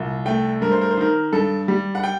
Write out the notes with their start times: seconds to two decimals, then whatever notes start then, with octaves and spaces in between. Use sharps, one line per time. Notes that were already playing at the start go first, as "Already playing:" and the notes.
Already playing: C2 A#2
0.26 A3 G5
0.61 G2 A#4
0.72 C5
0.81 A#4
0.91 C5
0.97 D#3 A#4
1.32 G2 A4
1.68 G3
1.95 F#5
2.03 G5